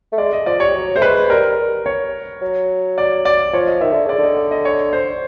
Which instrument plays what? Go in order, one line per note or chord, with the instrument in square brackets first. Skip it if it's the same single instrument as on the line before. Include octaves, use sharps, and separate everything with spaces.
[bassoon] A3
[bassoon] G#3 [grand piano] D5
[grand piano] D#5
[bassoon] F3 [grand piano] D5
[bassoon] G3 [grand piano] C#5
[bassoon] F#3
[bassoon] A3 [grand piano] C5
[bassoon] G#3 [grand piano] B4
[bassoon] G#3
[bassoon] G3 [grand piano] A#4
[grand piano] C#5
[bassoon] F#3
[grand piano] D5
D5
[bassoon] F3 [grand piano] C#5
[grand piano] D#5
[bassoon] D#3 [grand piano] E5
[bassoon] D3
[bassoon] C#3 [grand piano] D5
[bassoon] D3 [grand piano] D#5
[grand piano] D5
D#5
C#5
C5